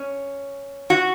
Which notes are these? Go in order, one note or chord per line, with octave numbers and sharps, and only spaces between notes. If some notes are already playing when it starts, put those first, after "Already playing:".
Already playing: C#4
F#4